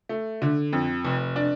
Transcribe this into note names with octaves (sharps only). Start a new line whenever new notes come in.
A3
D3
F2
F1
D4